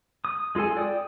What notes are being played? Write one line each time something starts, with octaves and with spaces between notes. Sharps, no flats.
D#6
G#3 F4 G#4 A4 G#5
D5 G5 D#6